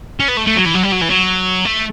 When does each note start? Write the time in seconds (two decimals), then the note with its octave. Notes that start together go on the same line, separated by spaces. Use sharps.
0.20 C#4
0.28 B3
0.37 A3
0.47 A3
0.56 F#3
0.66 E3
0.75 F#3
0.84 G3
0.93 F#3
1.02 E3
1.10 F#3
1.65 A3